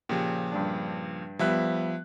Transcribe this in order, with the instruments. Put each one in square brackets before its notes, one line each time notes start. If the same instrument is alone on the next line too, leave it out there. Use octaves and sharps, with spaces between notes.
[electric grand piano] A#2 C#3 F3 [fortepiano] G4
[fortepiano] G2 D4
[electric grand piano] F3 E5 F#6 [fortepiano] G3 B3